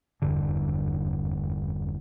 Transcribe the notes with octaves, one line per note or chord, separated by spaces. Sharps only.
F1 E2 G2 D3